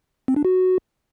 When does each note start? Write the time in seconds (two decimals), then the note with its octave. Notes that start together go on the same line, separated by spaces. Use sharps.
0.28 C4
0.36 D4
0.45 F#4